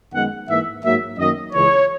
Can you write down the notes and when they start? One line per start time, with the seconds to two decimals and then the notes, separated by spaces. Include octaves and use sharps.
0.13 F#2 D#3 G#3 B3 F#5
0.48 G#2 E3 A#3 E5
0.83 G#2 F#3 A#3 E5
1.18 F#2 D#3 A#3 D#5
1.53 C#2 C#3 E3 C#5